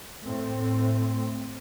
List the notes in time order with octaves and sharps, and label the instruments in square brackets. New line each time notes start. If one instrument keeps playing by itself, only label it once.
[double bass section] A2 A3 C4